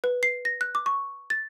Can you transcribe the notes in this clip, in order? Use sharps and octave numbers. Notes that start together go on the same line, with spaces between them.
B4
C7
A#6
F#6
D6
C#6
A6